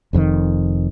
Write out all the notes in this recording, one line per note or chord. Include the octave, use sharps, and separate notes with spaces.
F1 F2 B2 D#3